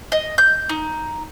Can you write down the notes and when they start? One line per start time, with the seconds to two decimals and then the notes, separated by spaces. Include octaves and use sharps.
0.12 D#5
0.38 G6
0.69 D#4